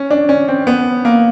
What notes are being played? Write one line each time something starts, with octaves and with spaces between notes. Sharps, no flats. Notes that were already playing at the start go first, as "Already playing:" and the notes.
Already playing: C#4
D4
C#4
C4
B3
A#3